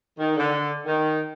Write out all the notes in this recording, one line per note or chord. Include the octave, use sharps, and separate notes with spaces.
D#3
D3
D#3